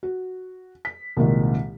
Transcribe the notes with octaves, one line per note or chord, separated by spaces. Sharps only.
F#4
B6
C2 A#2 D#3 G#3